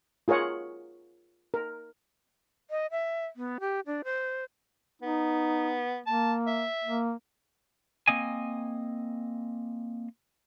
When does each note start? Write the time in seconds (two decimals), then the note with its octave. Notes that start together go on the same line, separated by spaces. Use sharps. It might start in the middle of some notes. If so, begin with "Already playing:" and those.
0.28 F4 G#4 A#4 C#5 F#5
1.54 A#4
2.71 D#5
2.91 E5
3.36 B3
3.60 G4
3.86 D4
4.04 C5
5.02 B3 D#4
6.07 A#3 A5
6.47 E5
6.84 A#3
8.08 A#3 C4 D#5 G#5